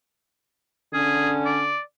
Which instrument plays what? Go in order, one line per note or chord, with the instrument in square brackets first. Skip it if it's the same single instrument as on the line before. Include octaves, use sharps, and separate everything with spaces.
[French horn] D3 [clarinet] C#4 [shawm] G#4
[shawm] D5